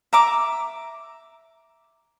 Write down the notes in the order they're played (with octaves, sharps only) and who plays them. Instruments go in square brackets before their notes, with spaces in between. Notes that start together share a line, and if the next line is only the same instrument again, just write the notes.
[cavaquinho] E5 A#5 D6